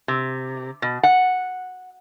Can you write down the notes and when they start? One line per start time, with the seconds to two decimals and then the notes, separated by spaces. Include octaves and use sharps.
0.08 C3
0.82 B2
1.03 F#5